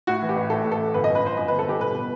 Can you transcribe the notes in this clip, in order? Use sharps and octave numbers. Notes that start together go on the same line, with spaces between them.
A2 F#4
E3
G4
A1
A2 A4
A2
A4
A1
G1 B4
D#5
F#2
B4
G1 C5
F#2 D#5
B4
G1
A4
G1 G4
B2 B4
B2